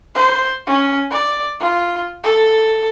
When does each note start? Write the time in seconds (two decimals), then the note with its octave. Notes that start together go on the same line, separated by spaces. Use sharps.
0.15 C5
0.67 C#4
1.11 D5
1.60 F4
2.24 A4